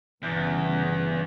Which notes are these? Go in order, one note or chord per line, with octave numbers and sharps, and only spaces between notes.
G1 E2 G2 C#3